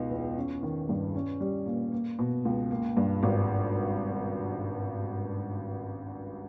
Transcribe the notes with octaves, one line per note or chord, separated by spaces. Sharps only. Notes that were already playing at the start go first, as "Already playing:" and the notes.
Already playing: C#2 B2 D#4
E2
C#4
D#3
G2
C#4
G3
A#2
A#3
B2
C#2
A#3
G2
G#1